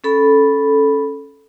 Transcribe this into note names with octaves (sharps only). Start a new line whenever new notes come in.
C#4 A4 B5